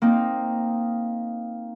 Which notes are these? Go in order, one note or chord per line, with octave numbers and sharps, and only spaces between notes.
A#3 C4 D#4